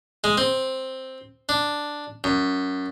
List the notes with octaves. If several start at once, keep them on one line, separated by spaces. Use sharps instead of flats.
G#3
C4
D4
F#2